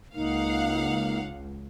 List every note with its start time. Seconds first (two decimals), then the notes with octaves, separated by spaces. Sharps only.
0.15 C#2 A#3 D#4 F5 F#5